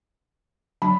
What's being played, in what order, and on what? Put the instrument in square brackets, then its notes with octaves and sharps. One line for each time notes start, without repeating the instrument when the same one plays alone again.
[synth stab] D3 F#3 D4 [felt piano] B5